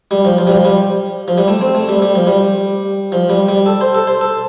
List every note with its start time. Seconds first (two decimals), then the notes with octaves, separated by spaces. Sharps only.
0.11 G3
0.25 F3
0.38 F3
0.47 G3
0.52 F3
0.65 G3
1.28 F3
1.38 G3
1.48 A3
1.61 C4
1.75 A3
1.89 G3
2.02 G3
2.15 F3
2.27 G3
3.12 F3
3.30 G3
3.48 G3
3.66 A4
3.81 C5
3.95 A4
4.07 C5
4.21 A4